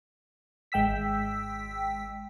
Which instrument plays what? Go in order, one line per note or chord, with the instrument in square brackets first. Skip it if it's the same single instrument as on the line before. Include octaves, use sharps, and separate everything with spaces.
[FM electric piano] G#1 G#3 G5 E6 B6